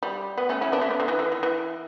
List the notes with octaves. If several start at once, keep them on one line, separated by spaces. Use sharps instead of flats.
G3
B3
A3 C#4
C#4 E4
B3 D4
A3 C#4
B3
D3
E3
E3
E3
E3